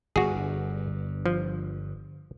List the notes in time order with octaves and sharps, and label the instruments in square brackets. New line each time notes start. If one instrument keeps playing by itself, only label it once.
[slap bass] G1 G2 [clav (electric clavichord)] F#4 G#4
[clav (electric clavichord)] F3